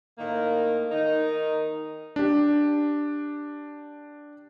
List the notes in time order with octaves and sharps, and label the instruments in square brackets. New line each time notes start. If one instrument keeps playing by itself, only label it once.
[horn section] A2 D#3 A#3
D#3 D#4
[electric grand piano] D4 G4